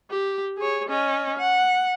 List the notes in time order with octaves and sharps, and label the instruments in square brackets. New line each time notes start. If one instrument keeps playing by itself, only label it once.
[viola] G4
G#4 C#5
C#4 D#5
F#5